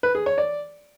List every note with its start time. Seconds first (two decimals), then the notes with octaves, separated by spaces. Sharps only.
0.03 B4
0.15 G#4
0.26 C#5
0.38 D5